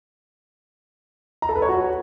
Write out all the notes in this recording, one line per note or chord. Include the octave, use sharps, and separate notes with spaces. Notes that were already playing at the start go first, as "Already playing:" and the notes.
A#5
A4
B4
C#5
F#4